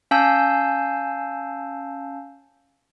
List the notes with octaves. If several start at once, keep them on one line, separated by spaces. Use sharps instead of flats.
C#4 F5 G#5 A5 E6 G6